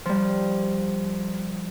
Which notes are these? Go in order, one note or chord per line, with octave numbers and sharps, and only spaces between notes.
F3 G3